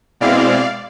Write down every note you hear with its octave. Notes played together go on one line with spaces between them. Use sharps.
B2 G#3 C4 E4 D5 F5